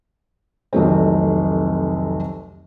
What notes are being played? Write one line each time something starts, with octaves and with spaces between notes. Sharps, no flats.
F1 C2 D#3 F#3 A3 C4